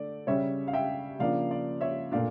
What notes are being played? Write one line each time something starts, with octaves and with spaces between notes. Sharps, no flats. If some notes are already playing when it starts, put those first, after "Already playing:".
Already playing: D3 A3 D5
C#3 G3 C#4 C#5 E5
F5
E5 G5
C#3 F3 A#3 D4 D5 F5
D5
C#5 E5
A#2 A3 D4 D5 F5